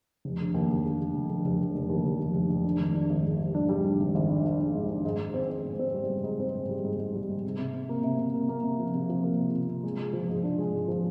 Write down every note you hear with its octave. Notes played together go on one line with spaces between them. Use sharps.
F1
D3
D#2
F1
D3
D3
F1
D3
F1
F1
F1
D#2
F1
F1
F1
F1
D4
G#1
D4
G#1
G#2
G3
D4
G3
D4
G#1
G#1
D4
D4
D4
G#2
D4
G#2
G#2
C4
C4
G#2
C4
G3
G#2
G#2
C4
G#2
G3
G#2
G#2
G3
G#2
C3
C3
C3
A#3
C3
C3
A#3
A#3
C3
F3
C3
F3
A#3
C3
C3
C3
G#3
G#3
F3
G#2
D4
G#3
G#2
F3